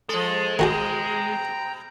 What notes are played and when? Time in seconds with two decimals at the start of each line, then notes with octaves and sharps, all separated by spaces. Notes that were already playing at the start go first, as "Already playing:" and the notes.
0.09 F3 G#3 A4
0.59 B2 D#3 F#4 G#4 G5 A#5